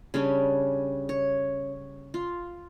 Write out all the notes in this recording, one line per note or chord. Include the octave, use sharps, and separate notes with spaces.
C#3 G3 C#4 D4
C#5
F4